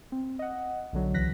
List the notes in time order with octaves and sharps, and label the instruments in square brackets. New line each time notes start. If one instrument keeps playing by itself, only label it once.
[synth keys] C4
D#5 F#5
B1 D3 F#3
C#2 E3 F#6 A#6 B6